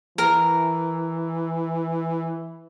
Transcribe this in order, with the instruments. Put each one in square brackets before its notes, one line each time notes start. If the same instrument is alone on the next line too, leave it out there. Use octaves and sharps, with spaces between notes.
[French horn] E3 [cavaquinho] A#4